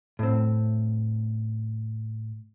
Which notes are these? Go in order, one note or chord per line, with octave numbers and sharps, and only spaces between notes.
A2 C4